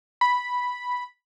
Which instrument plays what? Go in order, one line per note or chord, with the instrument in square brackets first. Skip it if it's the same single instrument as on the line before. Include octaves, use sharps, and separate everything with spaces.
[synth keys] B5